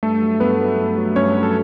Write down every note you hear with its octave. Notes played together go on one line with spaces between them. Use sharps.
G2 A3 A4
F#3
G2 B3 B4
F#3
G2
F#3
G2 C#4 C#5
F#3
A4